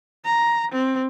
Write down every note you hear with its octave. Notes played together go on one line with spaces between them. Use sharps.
A#5
C4